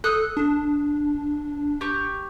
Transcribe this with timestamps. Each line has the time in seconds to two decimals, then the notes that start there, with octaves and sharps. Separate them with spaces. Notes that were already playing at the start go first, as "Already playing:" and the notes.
0.04 A4 D#6 F#6
0.37 D4
1.81 G4 C#6